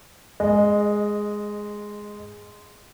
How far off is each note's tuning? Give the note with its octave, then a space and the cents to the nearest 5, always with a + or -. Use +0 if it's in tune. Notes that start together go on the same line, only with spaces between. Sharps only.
G#3 +0 D#5 -20